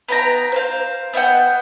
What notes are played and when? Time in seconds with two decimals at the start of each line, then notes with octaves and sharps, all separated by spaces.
0.09 B3 G5 A#5
0.52 C5 F5
1.13 B3 E5 F#5 G5